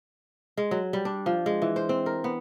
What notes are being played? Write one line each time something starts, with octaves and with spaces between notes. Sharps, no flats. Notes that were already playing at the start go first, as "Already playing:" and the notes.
G#3
F#3
G3
D4
F3
G#3
E3
C5
C4
A#4
B3